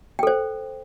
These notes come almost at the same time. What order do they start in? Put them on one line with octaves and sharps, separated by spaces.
G5 A4 C5